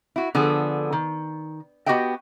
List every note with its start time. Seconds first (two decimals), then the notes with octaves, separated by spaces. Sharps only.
0.16 E4 F#4
0.35 D3 F3 B3 G#4 A4
0.93 D#3
1.86 B3 F#4 G4 D#5 E5 G5